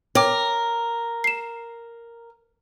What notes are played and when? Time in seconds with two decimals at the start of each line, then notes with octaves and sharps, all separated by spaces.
0.15 A#4 C#5 G5 D6
1.24 C7 E7